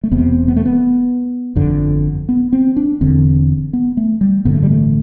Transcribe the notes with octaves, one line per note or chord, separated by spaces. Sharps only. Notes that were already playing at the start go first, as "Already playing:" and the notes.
A3
E1 E2 C3 B3
B3
A3
B3
G1 F2 D3
B3
C4
D4
E1 E2 D3 C4
B3
A3
G3
A1 G2 D3 B3
A3
G3
A3